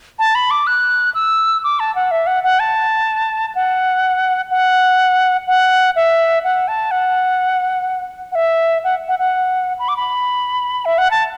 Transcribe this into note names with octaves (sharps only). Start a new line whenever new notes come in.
A5
B5
D6
F#6
E6
D6
A5
F#5
E5
F#5
F#5
A5
F#5
F#5
F#5
E5
F#5
A5
F#5
F#5
E5
F#5
F#5
F#5
B5
D6
B5
E5
F#5
A5